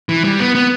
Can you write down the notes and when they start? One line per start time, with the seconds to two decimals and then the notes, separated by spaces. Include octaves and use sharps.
0.09 E3
0.24 G3
0.40 B3
0.55 B3